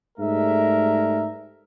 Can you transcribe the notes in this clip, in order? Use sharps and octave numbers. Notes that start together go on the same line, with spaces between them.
G#2 G3 A3 G#4 A#4 E5